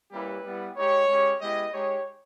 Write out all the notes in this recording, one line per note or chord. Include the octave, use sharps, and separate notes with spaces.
G3 A#3 C#4 E4 G4 B4
G3 B3 E4
G#3 D#4 G4 C#5
G#3 C#4 G4
G#3 B3 E4 G4 D#5
G#3 D#4 G4 C#5